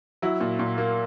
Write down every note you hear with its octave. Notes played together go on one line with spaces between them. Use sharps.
F#3 E4
A#2
A#2
A#3